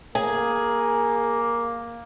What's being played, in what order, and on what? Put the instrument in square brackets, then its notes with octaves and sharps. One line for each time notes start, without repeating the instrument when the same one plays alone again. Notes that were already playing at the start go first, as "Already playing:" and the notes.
[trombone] A#3 [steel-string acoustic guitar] G#4